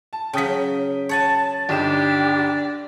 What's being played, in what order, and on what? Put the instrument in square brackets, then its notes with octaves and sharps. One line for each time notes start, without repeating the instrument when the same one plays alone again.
[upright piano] A5
[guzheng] C#3 F#3 [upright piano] G5 D#6 B6
[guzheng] C#5 F#5 G#5 [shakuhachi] A5
[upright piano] G1 D#4 E7 [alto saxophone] D4 [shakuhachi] G4